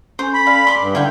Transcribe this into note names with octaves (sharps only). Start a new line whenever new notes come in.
C#4 A4 C5 G#5
B5
D5 F5
C6 D6
G2
D3 E4 F5 G5